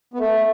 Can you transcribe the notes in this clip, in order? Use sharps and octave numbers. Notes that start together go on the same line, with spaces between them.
B3
A3